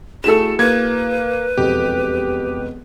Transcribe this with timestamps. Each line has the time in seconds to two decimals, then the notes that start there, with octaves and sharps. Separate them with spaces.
0.24 A3 E4 F#4 G#4 A4 E7
0.59 A#3 B4 G#6
1.57 E1 F2 B2 G4